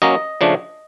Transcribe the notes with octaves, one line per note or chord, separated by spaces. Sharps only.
F#3 A#3 C#4 D#5
C#3 F3 A3 D4